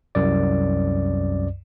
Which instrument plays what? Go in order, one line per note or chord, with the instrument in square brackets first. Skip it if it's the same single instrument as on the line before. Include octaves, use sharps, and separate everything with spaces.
[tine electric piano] C2 F#2 D5